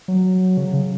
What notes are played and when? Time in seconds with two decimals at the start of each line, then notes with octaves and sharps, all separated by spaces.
0.08 F#3
0.57 C#3
0.74 C#3